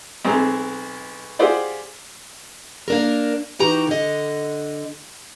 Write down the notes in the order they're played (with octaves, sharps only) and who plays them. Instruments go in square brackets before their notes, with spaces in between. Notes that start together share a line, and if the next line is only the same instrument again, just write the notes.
[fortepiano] B1 G#3 C4 A#5
F4 G4 G#4 C5 D5 F#5
[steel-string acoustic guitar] A#3 D4 A#4
E3 D#4 F#4 G4 A#5
D3 D#5